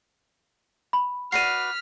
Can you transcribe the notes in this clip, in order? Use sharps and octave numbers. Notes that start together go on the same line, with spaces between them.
B5
F#4 B4 D5 F6 B6 C7 D#7